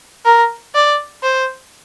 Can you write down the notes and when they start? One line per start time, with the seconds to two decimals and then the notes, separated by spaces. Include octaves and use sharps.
0.25 A#4
0.75 D5
1.23 C5